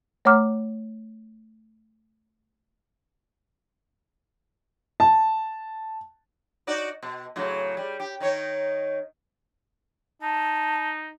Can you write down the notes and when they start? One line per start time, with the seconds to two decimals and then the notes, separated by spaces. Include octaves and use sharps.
0.25 A3 C#5 F#5 A#5 D6 F6
5.00 A5
6.67 D#4 F#4 D5
7.03 B2
7.36 A2 C#3 F#3
7.77 G3
8.00 G4
8.20 D#3 D#4 C#5
10.22 D#4 A5